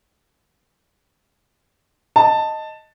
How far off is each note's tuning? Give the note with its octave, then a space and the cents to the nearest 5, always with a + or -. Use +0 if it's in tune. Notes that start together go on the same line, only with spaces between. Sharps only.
D#5 +0 A5 +10